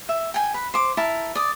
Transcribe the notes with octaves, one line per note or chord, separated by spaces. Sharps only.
E5
G5 G#5
B4
C5 D6
E4 A#4 A5
D5 D#6